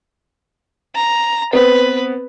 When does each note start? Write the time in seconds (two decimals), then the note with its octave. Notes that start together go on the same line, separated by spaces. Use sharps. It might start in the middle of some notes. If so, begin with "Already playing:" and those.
0.96 A#5
1.53 B3 C4 B4